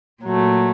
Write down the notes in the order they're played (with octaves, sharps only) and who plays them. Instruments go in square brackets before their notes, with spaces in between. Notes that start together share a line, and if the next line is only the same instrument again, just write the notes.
[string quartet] A#2 F#3 A3